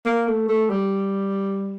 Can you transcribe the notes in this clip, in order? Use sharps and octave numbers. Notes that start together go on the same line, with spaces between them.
A#3
A3
A3
G3